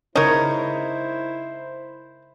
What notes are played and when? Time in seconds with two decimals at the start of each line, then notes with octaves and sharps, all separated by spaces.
0.16 C#3 D#4 E4 A#4 C5 C#5